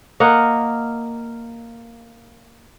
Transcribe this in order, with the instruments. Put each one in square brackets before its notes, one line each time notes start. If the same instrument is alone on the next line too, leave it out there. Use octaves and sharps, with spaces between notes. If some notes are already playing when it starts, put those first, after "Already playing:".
[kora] A#3 D#5 F#5